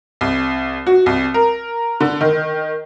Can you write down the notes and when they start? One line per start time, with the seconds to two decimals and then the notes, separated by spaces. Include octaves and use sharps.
0.21 C2
0.87 F#4
1.06 C2
1.34 A#4
2.01 D3
2.21 D#3